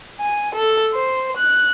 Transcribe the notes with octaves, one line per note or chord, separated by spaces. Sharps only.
G#5
A4
C5
F#6